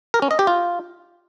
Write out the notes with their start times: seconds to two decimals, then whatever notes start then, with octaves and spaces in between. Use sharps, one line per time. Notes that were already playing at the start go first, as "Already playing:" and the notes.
0.14 A#4
0.22 C#4
0.31 D#5
0.39 G4
0.47 F4